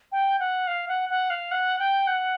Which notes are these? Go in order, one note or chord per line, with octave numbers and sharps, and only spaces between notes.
G5
F#5
F5
F#5
F#5
F5
F#5
G5
F#5